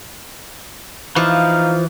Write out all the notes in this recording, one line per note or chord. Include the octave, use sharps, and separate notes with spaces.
E3 F3 D#4 F5